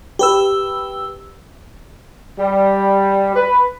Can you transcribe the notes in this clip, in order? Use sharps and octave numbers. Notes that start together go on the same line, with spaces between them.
G4 B4 E6
G3
B4